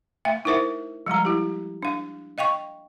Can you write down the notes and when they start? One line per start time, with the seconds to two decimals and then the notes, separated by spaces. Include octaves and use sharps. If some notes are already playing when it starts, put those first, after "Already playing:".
0.25 A3 E5 F5
0.45 D#4 E4 A#4 C5 E5
1.06 F3 G3 G#3 A#5
1.25 E4 G4
1.82 D4 F5
2.38 D#5 F5 G5 C#6